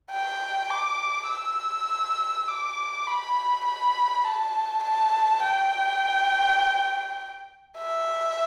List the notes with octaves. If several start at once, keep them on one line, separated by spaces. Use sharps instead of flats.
G5
D6
E6
D6
B5
B5
A5
A5
G5
E5